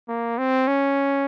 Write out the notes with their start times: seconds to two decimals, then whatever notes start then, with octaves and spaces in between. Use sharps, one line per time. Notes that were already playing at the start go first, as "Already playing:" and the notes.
0.08 A#3
0.38 C4
0.67 C#4